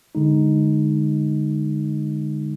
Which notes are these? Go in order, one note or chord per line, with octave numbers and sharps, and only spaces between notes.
D3 G#3 D#4